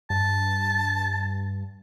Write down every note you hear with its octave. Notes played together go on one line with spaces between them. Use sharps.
G2 A5